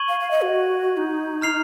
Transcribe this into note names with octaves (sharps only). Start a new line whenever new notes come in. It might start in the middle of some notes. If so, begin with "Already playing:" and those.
Already playing: C#6 G#6 D#7 F#7
F5
F5
D#5
F#4
D#4
A#5 F6 C7 F7